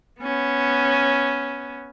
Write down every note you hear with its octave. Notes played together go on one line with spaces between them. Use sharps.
B3 C#4